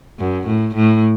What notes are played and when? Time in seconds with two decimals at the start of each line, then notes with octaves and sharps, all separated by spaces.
0.19 F#2
0.47 A2
0.75 A2